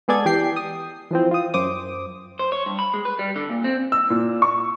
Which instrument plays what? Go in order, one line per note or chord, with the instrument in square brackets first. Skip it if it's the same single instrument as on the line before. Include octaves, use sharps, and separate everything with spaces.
[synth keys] G#3 B3 G#4 A4 D5 G#6
E3 G4 G5 C7
D#6
E3 F3 C4
F4 D#6
F#2 C5 D6 D#6
[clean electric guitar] C5
C#5
G2
B5
G#3
B4
G3
D3
A#2
C4
[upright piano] E6
A#2
C#6